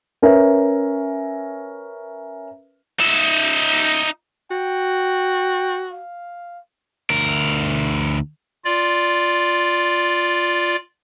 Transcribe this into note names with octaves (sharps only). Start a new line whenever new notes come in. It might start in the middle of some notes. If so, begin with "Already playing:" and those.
C#4 A#4 B4 E5
D#4 E5
F#4 G5
F5
D2 A#4
F4 D5